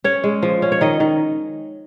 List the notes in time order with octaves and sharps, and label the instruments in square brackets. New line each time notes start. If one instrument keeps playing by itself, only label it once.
[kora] C#4 C#5
G#3
F3
C#4
C#5
D#3 D#5
D#3